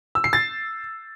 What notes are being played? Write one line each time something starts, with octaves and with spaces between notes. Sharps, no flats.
E6
C7
A6